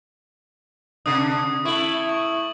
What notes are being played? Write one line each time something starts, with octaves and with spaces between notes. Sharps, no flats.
C3 D4 D#6
A3 E4 C#6 F#7
C#6